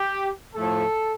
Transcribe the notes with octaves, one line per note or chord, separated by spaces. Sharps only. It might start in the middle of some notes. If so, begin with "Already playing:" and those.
Already playing: G4
A2 F3 A3 A4